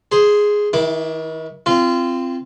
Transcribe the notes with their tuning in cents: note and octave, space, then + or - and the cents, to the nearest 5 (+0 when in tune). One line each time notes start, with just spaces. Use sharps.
G#4 +0 C5 +0
D#3 +40 E4 +0 D6 +10
C4 +0 F4 -25